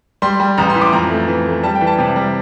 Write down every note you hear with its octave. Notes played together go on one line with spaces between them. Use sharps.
G3 C6
G3
A1 A#5
C6
E3
D6
F2 A#5
A3
E3
A3
G3 A5
G5
E3
A5
C3
G3